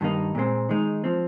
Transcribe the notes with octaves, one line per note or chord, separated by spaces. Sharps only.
G2 D#3 A#3 D#4
A#2 G#3 C4
D#3 G#3 D#4
F3 C4